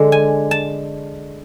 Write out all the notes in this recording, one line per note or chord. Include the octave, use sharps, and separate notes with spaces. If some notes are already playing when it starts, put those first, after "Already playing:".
Already playing: D3 G#3 D4
G#5
A5